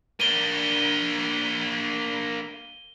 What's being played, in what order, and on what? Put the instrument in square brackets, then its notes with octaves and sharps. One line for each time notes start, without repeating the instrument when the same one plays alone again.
[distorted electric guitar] A#3 D4 [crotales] D#7 G7